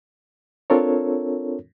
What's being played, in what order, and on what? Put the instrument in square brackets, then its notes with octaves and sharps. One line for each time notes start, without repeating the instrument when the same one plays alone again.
[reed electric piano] C4 D4 F4 A4 A#4 C#5